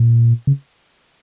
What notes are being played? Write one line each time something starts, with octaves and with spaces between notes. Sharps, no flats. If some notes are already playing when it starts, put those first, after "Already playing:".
Already playing: A#2
C#3